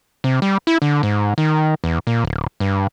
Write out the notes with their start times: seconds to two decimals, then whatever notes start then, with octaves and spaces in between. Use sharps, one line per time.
0.24 C3
0.42 G3
0.67 E4
0.82 D3
1.03 G#2
1.38 D#3
1.84 E2
2.07 A#2
2.24 D1
2.60 G2